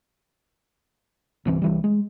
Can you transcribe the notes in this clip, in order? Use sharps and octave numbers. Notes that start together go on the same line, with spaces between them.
G1 C2 E3 C4
C2 E3 G3
G#3